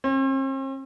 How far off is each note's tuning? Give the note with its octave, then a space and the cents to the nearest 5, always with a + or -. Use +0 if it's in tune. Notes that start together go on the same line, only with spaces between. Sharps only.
C4 +45